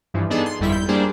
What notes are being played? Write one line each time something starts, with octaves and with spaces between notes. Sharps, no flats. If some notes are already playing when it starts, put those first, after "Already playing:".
G2 E3 F3
B3 D4 D#4 G#4 A4
C6
G1 F2 G3 E4 B6
G6
G3 A#3 D4 G#4 C5